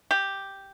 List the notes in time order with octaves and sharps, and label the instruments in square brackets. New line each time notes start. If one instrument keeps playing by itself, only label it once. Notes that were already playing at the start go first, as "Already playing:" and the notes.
[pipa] G4